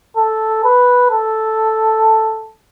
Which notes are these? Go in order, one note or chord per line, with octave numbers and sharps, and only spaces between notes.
A4
B4
A4